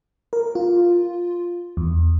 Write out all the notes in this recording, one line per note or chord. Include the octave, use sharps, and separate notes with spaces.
A#4
F4
E2